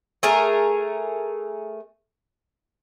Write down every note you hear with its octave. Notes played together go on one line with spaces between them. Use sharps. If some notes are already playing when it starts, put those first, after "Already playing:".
A3 G#4 A#4